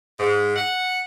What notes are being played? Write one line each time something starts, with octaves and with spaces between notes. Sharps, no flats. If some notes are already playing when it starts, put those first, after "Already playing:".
G#2
F#5